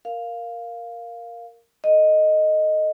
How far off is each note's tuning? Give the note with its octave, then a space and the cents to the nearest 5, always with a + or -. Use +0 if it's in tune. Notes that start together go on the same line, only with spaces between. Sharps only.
A#4 +0 F5 +0
A4 +0 D#5 +0